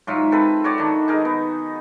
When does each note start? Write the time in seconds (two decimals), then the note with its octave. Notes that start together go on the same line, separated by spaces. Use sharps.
0.07 G#2 F#3 F4 E5
0.32 C4 A4 B4
0.64 F#4 C#5 D5
0.78 D#3 D4
1.08 D#4 G#4 A#4
1.25 B3